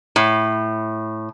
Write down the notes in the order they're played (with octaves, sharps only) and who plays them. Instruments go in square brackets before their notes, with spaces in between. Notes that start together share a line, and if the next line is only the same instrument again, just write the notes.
[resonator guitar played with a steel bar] A2